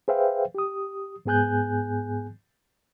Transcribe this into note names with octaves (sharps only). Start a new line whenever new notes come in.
G#4 B4 C5 E5 F5 G5
G4 D#6
G#2 B3 G#4 G#5 F#6 G6